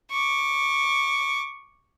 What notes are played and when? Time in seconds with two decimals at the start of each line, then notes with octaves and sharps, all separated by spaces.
0.12 C#6 D6